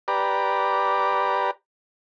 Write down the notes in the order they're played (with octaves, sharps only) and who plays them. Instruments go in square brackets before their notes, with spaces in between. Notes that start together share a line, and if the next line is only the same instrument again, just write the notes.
[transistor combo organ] G4 B4 D5 A#5